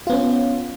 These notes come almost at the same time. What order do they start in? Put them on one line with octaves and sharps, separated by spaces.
F4 B3 C#4